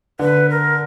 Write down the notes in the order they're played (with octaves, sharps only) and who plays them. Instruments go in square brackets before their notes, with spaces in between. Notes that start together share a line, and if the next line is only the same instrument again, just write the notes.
[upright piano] D3 [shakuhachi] B4
[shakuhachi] A#4